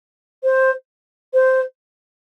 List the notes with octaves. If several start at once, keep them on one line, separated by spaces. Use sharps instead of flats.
C5
C5